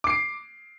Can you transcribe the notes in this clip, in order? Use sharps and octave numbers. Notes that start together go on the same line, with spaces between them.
D6 C7 D7